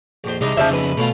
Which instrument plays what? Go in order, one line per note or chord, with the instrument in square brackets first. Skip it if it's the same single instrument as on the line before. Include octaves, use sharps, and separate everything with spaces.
[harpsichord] A#1 F2 C5
[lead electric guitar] C2 [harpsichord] G#3 D4 D#4
[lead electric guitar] F2 C#3 [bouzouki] F3 F#3 E5
[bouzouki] B4
[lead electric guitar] B2 [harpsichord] A3 C#4 F4